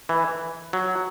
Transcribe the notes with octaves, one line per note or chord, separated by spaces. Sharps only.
E3
F#3